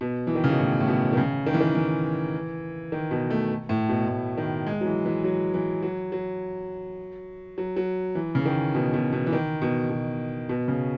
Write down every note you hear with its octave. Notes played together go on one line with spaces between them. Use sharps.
B2
E3
D#3
C#3
B2
A2
A2
B2
D#3
C#3
D#3
E3
D#3
E3
D#3
B2
A3
A2
B2
A2
D#3
G#3
F#3
E3
E3
F#3
E3
F#3
F#3
F#3
F#3
E3
C#3
D#3
B2
B2
B2
E3
D#3
B2
B2
B2
C#3